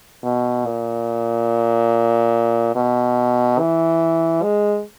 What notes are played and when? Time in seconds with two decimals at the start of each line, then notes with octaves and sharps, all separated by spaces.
0.24 B2
0.66 A#2
2.76 B2
3.60 E3
4.43 G#3